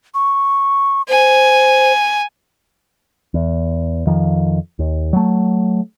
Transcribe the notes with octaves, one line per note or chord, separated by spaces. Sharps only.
C#6
C5 G#5
E2
F2 D#3 F3
D#2
F#3 A3